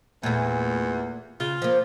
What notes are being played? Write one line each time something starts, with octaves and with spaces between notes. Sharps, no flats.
E2 A#2 A3
C#3 F4
F3 A#3